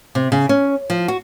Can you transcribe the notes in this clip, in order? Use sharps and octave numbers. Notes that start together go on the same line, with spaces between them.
C3
C#3
C#4
F3
F#4